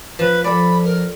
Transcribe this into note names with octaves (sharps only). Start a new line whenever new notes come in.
F3 B4
F3 A4 D5 B5
A#4